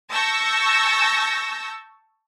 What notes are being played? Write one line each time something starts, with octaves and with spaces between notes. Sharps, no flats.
A5 C#6 E6 G6 A#6